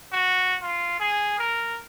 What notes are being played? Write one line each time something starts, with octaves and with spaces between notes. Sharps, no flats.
F#4
F4
G#4
A#4